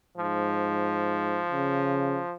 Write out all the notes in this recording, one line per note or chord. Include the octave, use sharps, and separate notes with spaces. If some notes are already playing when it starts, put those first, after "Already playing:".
G#2 F3
C#3